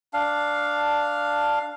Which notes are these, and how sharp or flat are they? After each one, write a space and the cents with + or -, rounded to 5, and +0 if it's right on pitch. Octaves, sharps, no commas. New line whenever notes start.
D4 +0 F5 +0